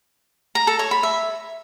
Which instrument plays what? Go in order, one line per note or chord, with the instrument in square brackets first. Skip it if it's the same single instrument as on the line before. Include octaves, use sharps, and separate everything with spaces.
[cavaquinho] A#5
A4
C#5
B5
E5